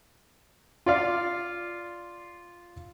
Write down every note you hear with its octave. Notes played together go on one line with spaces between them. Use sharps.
F4 D5 F5